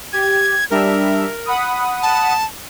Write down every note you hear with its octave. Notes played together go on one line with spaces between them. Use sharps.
G4 G#6
G3 D4 A#4 E5
F#5 B5 D#6
A5